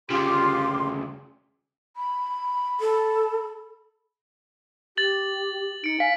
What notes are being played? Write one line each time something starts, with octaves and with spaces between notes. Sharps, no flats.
D2 C#3 F4 G4 C6 D6
B5
A4
G4 A6 F#7
D#4 C#7 D7
F5 G#5 B6